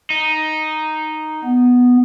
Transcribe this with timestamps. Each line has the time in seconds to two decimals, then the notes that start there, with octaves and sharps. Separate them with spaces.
0.10 D#4
1.44 B3